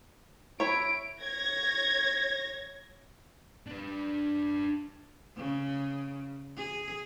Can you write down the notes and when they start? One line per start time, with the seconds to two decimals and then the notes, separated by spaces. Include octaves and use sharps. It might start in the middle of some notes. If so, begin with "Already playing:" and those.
0.60 E4 C#5 D7
1.21 C#5 G#6 A#6
3.67 D4 B4
5.37 C#3
6.57 G#4